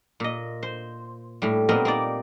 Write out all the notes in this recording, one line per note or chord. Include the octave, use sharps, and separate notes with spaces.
A#2 D#5
C5
A2 G3
A#2 B3 C4 A#4 D#5
A#3 D#4 D5